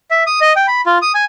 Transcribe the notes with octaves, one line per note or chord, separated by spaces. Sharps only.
E5
D#6
D#5
G5
B5
F4
D#6
G#5